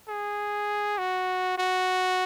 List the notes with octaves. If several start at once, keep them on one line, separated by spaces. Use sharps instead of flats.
G#4
F#4
F#4